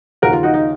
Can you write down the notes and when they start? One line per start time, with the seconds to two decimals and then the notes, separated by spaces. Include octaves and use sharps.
0.22 D#2 C#3 F3 F#4 A#4
0.33 F4
0.43 D#4 F#4
0.54 D#4